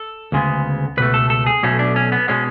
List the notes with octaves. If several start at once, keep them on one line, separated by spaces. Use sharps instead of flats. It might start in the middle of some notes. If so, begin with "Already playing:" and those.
Already playing: A4
D2 C#3 G#3 B3
C#2 B2 A3 B4
A4
A4
G#4
B1 B2 A3 C#4
D4
C#4
B3
B2 G#3 C#4